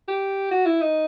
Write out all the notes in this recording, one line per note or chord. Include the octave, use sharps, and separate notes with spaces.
G4
F#4
E4
D#4